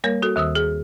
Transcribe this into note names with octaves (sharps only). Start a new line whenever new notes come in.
G3 A#3 A#4 C#5
F#4 A4
D#2 D#3 D#6 E6
G#4